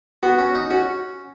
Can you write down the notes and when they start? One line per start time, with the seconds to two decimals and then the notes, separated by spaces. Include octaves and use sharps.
0.23 B3 F#4
0.38 C#4
0.55 D#4
0.70 C#4 F#4